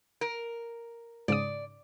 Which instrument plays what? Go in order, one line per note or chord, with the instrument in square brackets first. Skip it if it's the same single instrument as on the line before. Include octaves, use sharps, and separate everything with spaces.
[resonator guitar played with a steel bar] A#4
[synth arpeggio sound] G#2 C#3 D#6 [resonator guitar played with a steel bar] D5